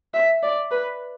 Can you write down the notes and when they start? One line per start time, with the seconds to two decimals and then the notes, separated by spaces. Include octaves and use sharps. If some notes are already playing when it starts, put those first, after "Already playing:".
0.14 E5
0.43 D5
0.71 B4